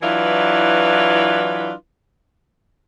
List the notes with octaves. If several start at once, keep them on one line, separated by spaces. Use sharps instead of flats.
E3 F#3 D4 E4 F4 B4